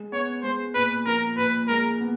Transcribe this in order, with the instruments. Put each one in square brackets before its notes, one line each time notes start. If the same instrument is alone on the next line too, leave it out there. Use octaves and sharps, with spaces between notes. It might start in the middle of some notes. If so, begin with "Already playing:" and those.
Already playing: [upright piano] G#3
[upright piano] B3 [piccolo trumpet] C#5
[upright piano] G#3 [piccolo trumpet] C5
[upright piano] A#2 [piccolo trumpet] B4
[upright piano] F3 [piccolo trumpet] A#4
[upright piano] A#2 [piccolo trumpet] B4
[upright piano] G#3 [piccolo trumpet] A#4
[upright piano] B3